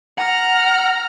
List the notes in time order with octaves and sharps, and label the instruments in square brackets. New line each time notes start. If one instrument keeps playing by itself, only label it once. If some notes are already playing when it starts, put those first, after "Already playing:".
[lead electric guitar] F#5 [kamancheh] A#5 F6